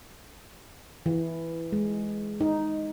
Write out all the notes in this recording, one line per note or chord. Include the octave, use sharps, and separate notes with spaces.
E3
G#3
D#4